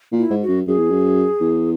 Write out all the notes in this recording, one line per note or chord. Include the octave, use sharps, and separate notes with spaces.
A#2
E4
G#2
F#4
F#2
F#2 G#4
E2
F#2
E2